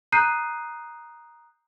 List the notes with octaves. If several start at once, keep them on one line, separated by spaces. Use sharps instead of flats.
A#5 D#6 F#6 G6 C7 D#7